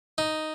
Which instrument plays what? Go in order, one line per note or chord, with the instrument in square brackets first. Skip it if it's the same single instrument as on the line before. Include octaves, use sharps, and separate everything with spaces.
[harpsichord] D#4